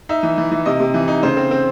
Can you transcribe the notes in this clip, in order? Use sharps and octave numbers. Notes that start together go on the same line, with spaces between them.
D#4 E5
E3
E3
E3
C3 D#5
C3
E3
D#4
C#3 C5
C4
C4